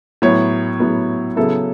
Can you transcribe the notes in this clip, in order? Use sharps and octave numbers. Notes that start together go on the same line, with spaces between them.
A2 F#3 B3 C#5
A2 F#3 B3
C#3 F#3 B3 E4 A4